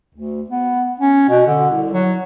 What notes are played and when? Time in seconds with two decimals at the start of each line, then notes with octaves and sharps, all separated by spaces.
0.14 D2
0.50 B3
1.00 C#4
1.29 B2
1.47 D3
1.70 C2
1.93 F#3